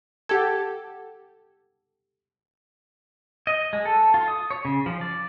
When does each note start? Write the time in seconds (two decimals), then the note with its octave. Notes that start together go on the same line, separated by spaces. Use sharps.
0.29 G4 A4 F#5 G#6
3.47 D#5
3.73 G#3
3.85 A4
4.14 F4
4.28 D#6
4.51 C#5
4.65 C#3
4.86 F3
5.01 D5